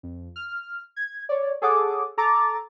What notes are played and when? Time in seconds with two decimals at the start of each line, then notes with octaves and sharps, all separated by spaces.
0.03 F2
0.36 F6
0.96 G#6
1.29 C#5 D5
1.62 G#4 A4 C#5 F#5 D6 D#6
2.18 A4 A#5 D6 A6